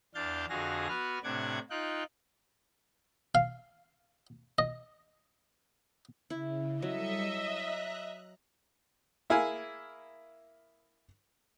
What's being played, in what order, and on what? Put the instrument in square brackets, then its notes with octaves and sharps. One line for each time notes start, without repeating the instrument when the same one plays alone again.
[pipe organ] E2 D4 F5 G6 A6
F2 D3 F#4 G#4 F5 A#6
B3 F#4 B4 F6
A2 C3 D4 F#5 D6 G#6
D#4 F4 G5 F#6
[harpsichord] F5
D#5
[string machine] C#3 [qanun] E4
[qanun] F#3 [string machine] G3 A4 C#7 [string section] D#5 E5
[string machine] A#5 F#6
[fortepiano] A#3 E4 G#4 F5 G#5